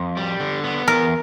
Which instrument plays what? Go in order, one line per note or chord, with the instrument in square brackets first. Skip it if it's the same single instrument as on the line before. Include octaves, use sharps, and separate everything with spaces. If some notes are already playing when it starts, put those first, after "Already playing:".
Already playing: [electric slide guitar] F2
G3
D3
B3
[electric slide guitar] E2 [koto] A#4